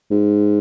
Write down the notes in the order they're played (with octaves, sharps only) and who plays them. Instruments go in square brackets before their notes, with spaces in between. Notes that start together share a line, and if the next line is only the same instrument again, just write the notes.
[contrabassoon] G#2